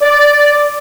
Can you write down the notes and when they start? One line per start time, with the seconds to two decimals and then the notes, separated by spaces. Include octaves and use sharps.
0.01 D5